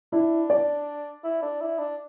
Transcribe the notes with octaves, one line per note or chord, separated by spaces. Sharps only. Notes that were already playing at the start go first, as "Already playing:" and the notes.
D4 E4
D5
E4
D4
E4
D4